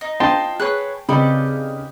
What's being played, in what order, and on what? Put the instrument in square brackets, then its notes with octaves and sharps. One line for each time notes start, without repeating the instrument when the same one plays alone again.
[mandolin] D#4
[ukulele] F4 C5 D#5 [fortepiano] G5 A5 C6
[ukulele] G#4 B4 C#5 [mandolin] F#6
[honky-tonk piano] C#3 C4 [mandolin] D#4 G4 B4 [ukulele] A4 D5 B5